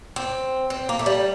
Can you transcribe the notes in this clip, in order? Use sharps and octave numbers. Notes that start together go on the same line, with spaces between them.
C4
C4
A#3
A3
G3